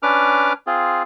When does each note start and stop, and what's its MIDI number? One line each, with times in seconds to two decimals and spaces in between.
0.03 0.53 61
0.03 0.53 62
0.03 0.53 71
0.03 0.53 86
0.03 0.53 89
0.67 1.03 60
0.67 1.03 65
0.67 1.03 68